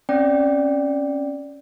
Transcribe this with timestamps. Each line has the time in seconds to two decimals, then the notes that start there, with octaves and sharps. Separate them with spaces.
0.09 C4 C#4 D5 G5